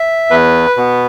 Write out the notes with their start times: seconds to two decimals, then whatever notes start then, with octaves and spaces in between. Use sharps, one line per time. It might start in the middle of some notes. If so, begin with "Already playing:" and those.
Already playing: E5
0.30 E2 B4
0.77 B2 B3